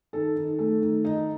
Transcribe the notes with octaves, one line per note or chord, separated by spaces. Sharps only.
D#3 A4
D#3
A3
D#3
D#4